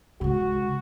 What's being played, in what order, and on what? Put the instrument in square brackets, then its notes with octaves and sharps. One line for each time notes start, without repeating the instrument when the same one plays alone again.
[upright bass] C#3 G#3 [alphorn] F#4